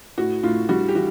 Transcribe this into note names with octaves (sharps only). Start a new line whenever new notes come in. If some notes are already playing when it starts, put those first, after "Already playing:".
A2 F#4
A2 F4
G3 F#4
G4
E3 F#4